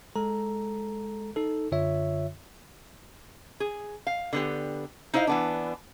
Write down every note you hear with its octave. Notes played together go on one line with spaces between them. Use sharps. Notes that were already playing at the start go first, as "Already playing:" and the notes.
G#3 A4 A#5
D#4 A4
F#2 D3 F4 C#5 E5
G#4
F5
D3 B3 G4
D#4 E4 C5 D#5 F5
E3 B3 D4